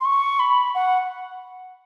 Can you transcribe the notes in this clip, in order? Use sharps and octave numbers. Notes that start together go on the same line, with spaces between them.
C6
C#6
B5
F#5